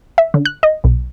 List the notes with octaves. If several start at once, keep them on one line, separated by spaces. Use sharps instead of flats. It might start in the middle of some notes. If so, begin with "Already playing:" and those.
E5
D3
F#6
D#5
B1